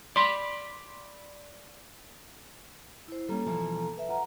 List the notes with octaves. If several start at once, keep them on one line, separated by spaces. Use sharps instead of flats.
D5 B5 C6
E4 C5
G3 A#3 C#4 A4 A#5
B2 E3 F3
B4 E5
F4 F#5 A#5